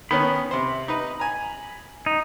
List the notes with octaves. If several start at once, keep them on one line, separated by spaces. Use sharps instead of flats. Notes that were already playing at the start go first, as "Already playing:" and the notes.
D#3 B3 C#4 B5
C3 C5
D#4 B4
G#5 A#5
D#4